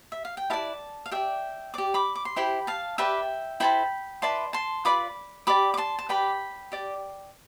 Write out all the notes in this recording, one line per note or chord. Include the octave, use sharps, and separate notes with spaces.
E5
F5
G5
E4 G4 B4 D5 F5 A5
F5
G4 D5 E5 G5
G4 D5 D6
B5 D6
D6
C6
E4 G4 C5 G5 B5
F5 A5
G4 B4 D5 E5 G5
E4 A4 C5 G5 B5
E4 B4 D5 A5 C6
A5 C6
F4 B4 D5 B5 D6
G4 D5 B5 D6
D6
A5 C6
A5
G4 B4 D5 G5 B5
G4 D5